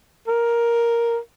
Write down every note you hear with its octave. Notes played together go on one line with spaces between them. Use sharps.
A#4